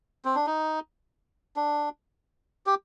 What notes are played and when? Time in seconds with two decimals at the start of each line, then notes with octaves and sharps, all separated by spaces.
0.25 C4
0.36 D4
0.47 D#4
1.56 D4
2.66 G4